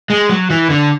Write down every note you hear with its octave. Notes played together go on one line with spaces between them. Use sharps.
G#3
F#3
E3
D3